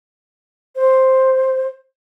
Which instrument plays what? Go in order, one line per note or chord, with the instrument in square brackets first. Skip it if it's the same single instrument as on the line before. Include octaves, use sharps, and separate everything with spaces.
[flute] C5